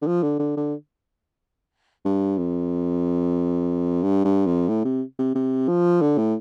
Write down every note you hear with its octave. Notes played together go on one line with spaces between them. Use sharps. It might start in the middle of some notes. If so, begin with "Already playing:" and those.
D3
F3
D3
D3
D3
G2
F2
G2
G2
F2
A2
C3
C3
C3
F3
D3
A2